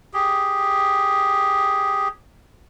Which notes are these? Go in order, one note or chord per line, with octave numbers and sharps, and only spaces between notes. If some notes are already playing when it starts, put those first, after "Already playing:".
G4 G#4